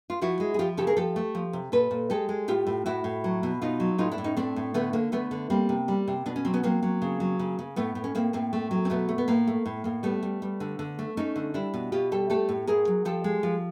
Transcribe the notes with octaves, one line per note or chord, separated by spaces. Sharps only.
F4
F3 E4 F#4
G#3
G#4
F3 F4 G4
C#3 G4 A4
G#4 A#4
F3 G4 A4
A3
F3
C3
A#2 A4 B4
A#2
G#3 G4 A4
G#3
A2 F4 G4
A2
A2 E4 F#4
A2
F#3
B2
B2 D#4 F4
F#3
A2 D#4 F4
D4 E4
A2
C#4 D#4
A3 C4 D4
A2
D3 A3 B3
D3 A#3
D3 A3 B3
D3
G3 A#3 C4
C3
G3
C3
B2 D4
C#4
F#3 C4
B3 C#4
F#3 A#3 C4
F#3
C#3
F#3
C#3
C#3
A2 A3 B3
A2
C#4
A2 A#3 C4
A2 A#3 C4
A3
F#3
C4
B2 A3 B3
A3
B3
A2 A#3
A3
A2
A2 A#3
G3 A3 B3
G3
G3
D3
D3
A3
A3 C#4 D#4
D3
G3 D4 E4
B2
B2 F4 G4
G3 G4 A4
A3 G4 A4
A2
A2 G#4 A#4
F#3
F3 G4 A4
G#3
F3